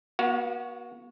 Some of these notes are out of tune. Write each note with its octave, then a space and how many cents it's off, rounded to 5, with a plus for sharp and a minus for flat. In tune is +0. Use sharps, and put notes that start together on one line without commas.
B3 -45 F#4 +0 F5 +0